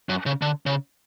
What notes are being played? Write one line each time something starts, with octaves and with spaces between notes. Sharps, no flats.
F#2
C#3
D3
C#3